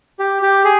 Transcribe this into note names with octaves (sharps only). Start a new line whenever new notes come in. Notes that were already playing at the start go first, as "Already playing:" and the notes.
G4
G4
G#4